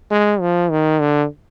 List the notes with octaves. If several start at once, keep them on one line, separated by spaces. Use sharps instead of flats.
G#3
F3
D#3
D3